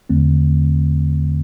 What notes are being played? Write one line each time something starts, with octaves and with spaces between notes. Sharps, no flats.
E2 D3 A3 C4